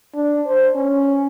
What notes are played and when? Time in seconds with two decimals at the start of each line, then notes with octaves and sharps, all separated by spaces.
0.15 D4
0.46 C5
0.75 C#4